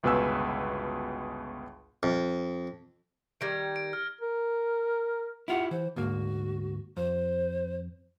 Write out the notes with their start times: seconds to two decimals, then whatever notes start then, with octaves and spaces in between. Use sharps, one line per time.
0.03 G1 C#2 B2 B4 G#5 E6
2.03 F2
3.41 D#3 G3 G#6 A#6 D7
3.76 D7
3.93 F6
4.21 A#4
5.48 E4 F4 G4 F#5
5.71 E3 C5
5.96 D2 G#2 A#3 F#4
6.97 F2 C5